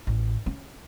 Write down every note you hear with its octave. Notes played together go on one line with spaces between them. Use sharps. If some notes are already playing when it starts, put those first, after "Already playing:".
A1
C#4